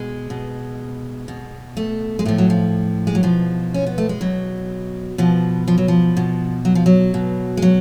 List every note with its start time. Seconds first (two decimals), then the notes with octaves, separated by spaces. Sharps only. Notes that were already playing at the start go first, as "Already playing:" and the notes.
Already playing: B2 G#3
0.30 B2
1.28 B2
1.77 A3
2.19 G#3
2.25 A2 F3 A3
2.38 F#3
2.50 F3
3.07 G#3
3.15 F#3
3.23 B2 F3
3.74 C#4
3.86 B3
3.98 A3
4.09 G#3
4.21 B2 F#3
5.18 B2 F3
5.68 F3
5.78 F#3
5.88 F3
6.17 B2
6.65 F#3
6.75 F3
6.86 F#3
7.14 B2
7.57 G#3
7.62 F#3